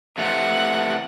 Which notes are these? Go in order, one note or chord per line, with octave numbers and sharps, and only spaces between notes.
C3 E3 A3 F#5